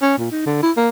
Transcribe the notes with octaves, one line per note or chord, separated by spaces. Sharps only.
C#4
A#2
D#4
D3
E4
A#3